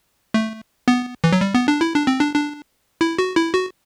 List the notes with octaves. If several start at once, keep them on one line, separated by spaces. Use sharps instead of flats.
A3
B3
E3
F#3
G3
B3
D4
E4
D4
C4
D4
D4
E4
F#4
E4
F#4